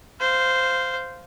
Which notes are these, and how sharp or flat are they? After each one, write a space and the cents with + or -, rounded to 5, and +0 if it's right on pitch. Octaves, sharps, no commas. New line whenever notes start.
C5 -10 F5 +0